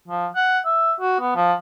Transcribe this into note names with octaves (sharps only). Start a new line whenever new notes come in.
F3
F#5
E5
F#4
B3
F3